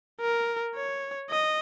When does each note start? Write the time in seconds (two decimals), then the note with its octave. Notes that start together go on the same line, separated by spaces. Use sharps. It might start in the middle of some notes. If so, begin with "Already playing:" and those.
0.21 A#4
0.75 C#5
1.31 D#5